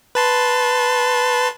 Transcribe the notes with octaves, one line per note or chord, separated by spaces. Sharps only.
B4 A5 C6